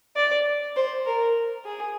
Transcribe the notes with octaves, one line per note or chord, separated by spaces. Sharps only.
D5
C5
A#4
G#4